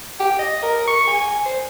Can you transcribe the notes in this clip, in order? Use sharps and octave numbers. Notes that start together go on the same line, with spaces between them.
G5
D#5
A#4
C#6
G#5
C5